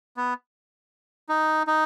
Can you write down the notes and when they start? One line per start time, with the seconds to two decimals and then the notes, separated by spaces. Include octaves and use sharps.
0.17 B3
1.29 D#4
1.67 D#4